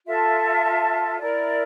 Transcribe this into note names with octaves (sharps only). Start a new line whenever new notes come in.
F4 A4 E5 A5
E4 A#4 D5